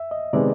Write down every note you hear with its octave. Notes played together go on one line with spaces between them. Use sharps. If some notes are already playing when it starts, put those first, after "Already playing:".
Already playing: E5
D#5
C3 D#3 G#3 B3 D5